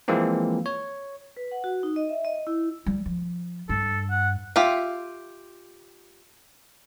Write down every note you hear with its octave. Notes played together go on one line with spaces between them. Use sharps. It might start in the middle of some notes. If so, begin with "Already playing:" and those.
E3 F3 G#3 A#3 C4
C#5
B4
F#5
F#4
D#4
D#5
E5
D#5
E4
G3
F3
G2 A4
F#5
F4 G4 E5